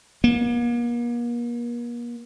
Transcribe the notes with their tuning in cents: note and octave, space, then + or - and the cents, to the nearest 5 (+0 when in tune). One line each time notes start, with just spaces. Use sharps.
A#3 +40